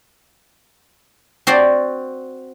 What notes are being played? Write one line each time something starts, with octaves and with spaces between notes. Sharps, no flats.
C4 F#4 C5 D5